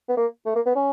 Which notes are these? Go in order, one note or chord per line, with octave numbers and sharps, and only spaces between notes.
B3
A#3
A3
A#3
B3
C#4